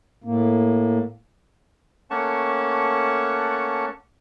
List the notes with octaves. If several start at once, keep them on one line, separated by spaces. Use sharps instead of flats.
A2 A#3
A3 A#3 C#4 F#5 A5 C#6